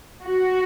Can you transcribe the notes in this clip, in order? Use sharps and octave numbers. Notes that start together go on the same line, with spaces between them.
F#4